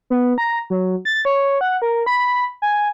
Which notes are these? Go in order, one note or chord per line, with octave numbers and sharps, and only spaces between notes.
B3
A#5
F#3
A6
C#5
F#5
A#4
B5
G#5